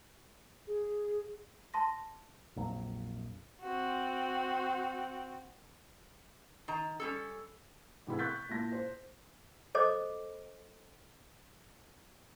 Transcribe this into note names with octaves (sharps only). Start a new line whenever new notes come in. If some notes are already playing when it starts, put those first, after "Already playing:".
G#4
A5 C6 A#6
A#1 F2 F#3
C4 F#4
D#3 A#5
G3 C#4 A4
A1 C3 E3 G#4 B5 E6
C#6 F#6 G6 A6 B6
A#2 E4 A5 A#6
C5
A4 C5 D#5 D6